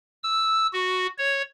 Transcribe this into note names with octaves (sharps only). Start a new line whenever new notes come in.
E6
F#4
C#5